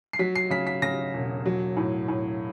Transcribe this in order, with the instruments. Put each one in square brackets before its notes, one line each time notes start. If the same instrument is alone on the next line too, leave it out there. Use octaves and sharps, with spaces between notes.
[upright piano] C7
F#3 B6
C7
C#3 B6
B6
C#3 A#6
E1
F#3
A2
A2